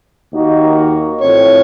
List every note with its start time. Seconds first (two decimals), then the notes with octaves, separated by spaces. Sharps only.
0.32 D#2 D#3 A#3 D#4 F#4
1.21 A1 A2 F3 C4 C#5